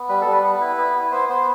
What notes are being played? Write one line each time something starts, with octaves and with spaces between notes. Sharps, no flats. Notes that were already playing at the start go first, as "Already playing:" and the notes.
Already playing: B3
G3 B4
A4
G3
B4
B3
E4
B3
E4
B3 C5
B3 C5